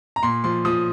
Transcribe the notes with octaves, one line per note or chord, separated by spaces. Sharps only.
A#5
A#2 C6
F3 C6
F3 D#6